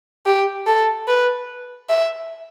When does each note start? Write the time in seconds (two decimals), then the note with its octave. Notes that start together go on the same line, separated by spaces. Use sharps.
0.26 G4
0.67 A4
1.08 B4
1.89 E5